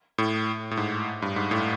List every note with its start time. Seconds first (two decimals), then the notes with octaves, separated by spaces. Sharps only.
0.18 A2
0.71 A2
0.77 G#2
1.22 G2
1.36 G#2
1.51 A2